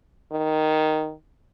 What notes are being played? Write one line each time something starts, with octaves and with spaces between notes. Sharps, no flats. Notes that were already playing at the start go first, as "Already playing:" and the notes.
D#3